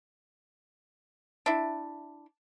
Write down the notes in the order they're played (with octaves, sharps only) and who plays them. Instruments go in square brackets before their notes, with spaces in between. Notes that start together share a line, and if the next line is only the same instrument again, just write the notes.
[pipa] D4 E4